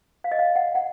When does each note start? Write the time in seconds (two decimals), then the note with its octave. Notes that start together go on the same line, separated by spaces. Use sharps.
0.24 F5
0.31 D#5
0.39 F5
0.56 F#5
0.75 F#5